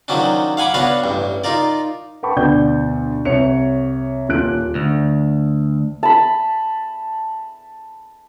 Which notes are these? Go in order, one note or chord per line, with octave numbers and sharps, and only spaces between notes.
D#3 F3 F#3 C#4 D4
F5 F#5 G#5 B5 D6
B3 D4 F#4 B4 C#5 F5
A1 G2
D#4 F4 A#4 D5
B4 F#5 G5 A5 B5 C#6
D2 B2 D5 G6
C2 C#5 C#7 F7
D#1 A#2 F4 F#6 D7
D2
A5 B5